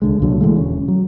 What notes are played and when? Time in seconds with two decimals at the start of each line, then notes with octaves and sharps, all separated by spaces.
0.02 C#2 D3 G#3
0.20 C2 A#2 D3 F#3
0.41 D3 E3 G#3 A3
0.56 E1 C#4
0.88 F#3